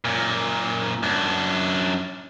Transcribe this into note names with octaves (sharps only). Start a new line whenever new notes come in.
F#2 A#2
F#2 D4